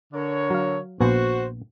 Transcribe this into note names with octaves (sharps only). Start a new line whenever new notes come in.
D3 A#4 C#5
F#3 F5
A#1 B3 F#4 C5 G#5